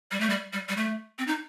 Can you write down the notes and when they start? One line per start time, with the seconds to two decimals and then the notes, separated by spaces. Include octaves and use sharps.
0.11 G3
0.20 A3
0.30 G3
0.53 G3
0.69 G3
0.77 A3
1.19 C4
1.27 D#4